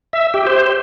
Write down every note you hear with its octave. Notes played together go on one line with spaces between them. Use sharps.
E5
G4
C5